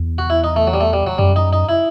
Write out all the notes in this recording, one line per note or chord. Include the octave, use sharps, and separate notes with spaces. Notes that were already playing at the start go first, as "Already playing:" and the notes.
Already playing: E2
F#4
E4
D#4
A3
F#3
G3
A3
G3
F#3
F#2 G3
D#4
D#4
E4